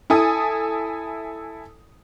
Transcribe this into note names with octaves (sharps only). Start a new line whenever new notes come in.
E4 A4 G#5 D#6